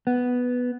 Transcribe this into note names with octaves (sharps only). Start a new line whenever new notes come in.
B3